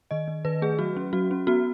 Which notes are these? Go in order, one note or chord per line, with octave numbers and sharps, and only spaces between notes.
D#3 D#5
D#3
D#3 B4
A3 G#4
F#3 F#4
C#4
F#3 F#4
C#4
B3 F#4